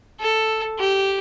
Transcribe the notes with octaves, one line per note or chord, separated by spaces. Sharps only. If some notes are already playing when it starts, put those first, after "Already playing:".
A4
G4